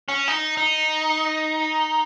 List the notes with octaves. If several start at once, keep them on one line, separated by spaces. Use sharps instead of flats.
C#4
D#4
D#4